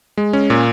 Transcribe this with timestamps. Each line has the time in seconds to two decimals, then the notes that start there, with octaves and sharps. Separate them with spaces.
0.17 G#3
0.33 C#4
0.50 A#2